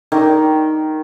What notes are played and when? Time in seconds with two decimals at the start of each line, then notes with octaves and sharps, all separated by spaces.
0.12 D#3